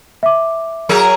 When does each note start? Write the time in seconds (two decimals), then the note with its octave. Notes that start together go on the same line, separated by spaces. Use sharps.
0.23 E5 D6
0.89 F#3 G#4 A#4